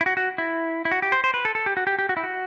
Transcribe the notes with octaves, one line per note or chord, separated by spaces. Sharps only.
E4
F#4
F#4
E4
E4
F#4
G4
C5
C5
B4
A4
A4
G4
F#4
G4
G4
F#4
E4
F#4